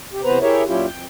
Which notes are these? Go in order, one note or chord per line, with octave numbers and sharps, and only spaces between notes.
C3 G4
C3 E3 B3 B4 C5 A#5
E4 G4 G#4 A#4 C#5 E5
A#2 F#3 C#4 E4 F4 G4
F2 G5